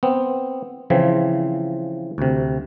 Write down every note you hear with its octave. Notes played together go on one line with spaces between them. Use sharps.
B3 C4
C#3 E3 F3 C4
D2 C3